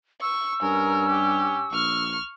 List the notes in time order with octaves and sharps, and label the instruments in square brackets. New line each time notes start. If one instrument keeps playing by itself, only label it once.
[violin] C#6 [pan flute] E6
[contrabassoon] G2 [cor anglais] C#4 [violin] A#4
[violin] G4
[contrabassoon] A#1 [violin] C#6 F6